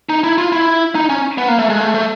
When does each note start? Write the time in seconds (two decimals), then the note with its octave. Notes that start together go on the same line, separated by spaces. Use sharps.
0.09 D#4
0.24 E4
0.38 F4
0.52 E4
0.95 D#4
1.09 C#4
1.38 B3
1.48 A#3
1.59 A3
1.70 G#3
1.80 A3
1.95 A3